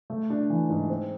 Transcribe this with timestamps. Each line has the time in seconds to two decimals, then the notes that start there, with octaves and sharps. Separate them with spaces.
0.10 A3
0.30 D4
0.50 E3
0.69 G#2
0.90 C4